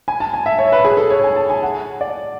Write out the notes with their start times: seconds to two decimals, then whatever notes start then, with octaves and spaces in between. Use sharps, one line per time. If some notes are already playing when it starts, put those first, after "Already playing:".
0.08 G#5
0.20 A5
0.33 G#5
0.46 E5
0.59 C#5
0.72 B4
0.85 G#4
0.97 A4
1.10 C#5
1.24 G#5
1.36 A5
1.50 G#5
1.63 F#5
2.01 D5